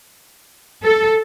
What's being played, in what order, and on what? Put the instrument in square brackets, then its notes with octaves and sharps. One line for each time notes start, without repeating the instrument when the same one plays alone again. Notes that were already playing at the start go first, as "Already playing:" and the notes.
[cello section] A4